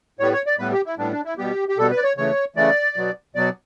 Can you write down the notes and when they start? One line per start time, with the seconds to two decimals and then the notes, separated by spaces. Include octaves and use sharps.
0.19 A2 G3 B3 C#5
0.33 C#5
0.46 D5
0.59 A2 G3 B3 B4
0.72 G4
0.86 E4
0.98 A2 G3 B3 D4
1.12 D4
1.25 E4
1.38 B2 G3 B3 G4
1.68 G4
1.78 B2 G3 B3 A4
1.91 B4
1.97 D5
2.04 C#5
2.17 C#3 E3 A3 C#5
2.56 C#3 E3 A3 D5
2.96 B2 F#3 B3
3.35 B2 F#3 B3 D5